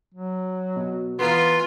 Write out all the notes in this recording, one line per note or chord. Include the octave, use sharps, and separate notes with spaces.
F#3
B2
E3 B3 F4 A#5 C6